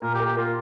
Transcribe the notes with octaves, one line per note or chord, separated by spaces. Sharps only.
A#2 A#4
G4
A#4
G4
A#3 F4